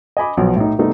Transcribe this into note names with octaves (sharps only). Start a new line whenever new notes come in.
D#5 G#5 B5 D6
B1 F3 B3
A2 D#4
C3 G3 A3 B3 D#4